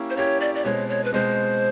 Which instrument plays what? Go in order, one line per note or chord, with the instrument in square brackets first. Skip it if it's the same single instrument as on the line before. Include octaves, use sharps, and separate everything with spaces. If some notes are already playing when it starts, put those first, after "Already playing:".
Already playing: [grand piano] A#3 C#4 E4 G4
[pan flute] C5
[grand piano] A#3 C#4 E4 G4 [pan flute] C#5
[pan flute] D5
D5
[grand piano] B2 G#3 C4 [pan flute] C#5
[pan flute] C#5
B4
[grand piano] B2 G#3 C4 [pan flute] C5